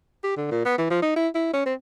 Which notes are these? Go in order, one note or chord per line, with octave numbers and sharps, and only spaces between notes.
G4
D3
A#2
B3
E3
F3
D#4
E4
E4
C#4
C4